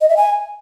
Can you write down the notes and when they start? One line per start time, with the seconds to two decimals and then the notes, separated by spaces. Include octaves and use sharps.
0.01 D#5
0.09 E5
0.17 G#5